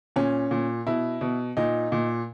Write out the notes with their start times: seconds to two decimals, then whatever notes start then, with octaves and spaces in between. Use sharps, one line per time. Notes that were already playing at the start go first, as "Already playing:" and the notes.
0.16 A#2 C#4
0.51 A#2
0.87 B2 E4
1.21 B2
1.57 A#2 D#4
1.92 A#2